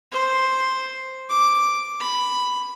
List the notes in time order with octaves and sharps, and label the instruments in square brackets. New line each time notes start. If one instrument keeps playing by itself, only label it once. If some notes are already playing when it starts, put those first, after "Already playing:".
[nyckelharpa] C5
D6
B5